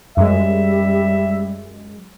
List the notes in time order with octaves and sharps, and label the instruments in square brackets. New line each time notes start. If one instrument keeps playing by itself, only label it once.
[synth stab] F#2 G#3 [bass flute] G3 [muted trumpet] E5